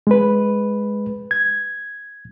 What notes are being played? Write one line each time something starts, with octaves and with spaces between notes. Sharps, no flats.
G#3 B4
G#6